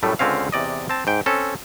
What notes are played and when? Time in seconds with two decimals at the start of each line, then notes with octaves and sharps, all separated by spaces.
0.03 F#2 A2 G3 A3
0.19 C#2 D3 C4 C#4 F5
0.52 E2 C3 D5 D#5
0.89 C4 A5
1.07 G#2 G5
1.26 C4 C#4 A4